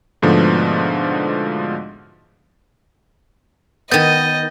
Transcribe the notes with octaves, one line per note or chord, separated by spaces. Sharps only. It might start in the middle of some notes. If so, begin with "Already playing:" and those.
G#2 B2 D3 F3 A3 B3
D#3 B3 D#5 G6 A6 D#7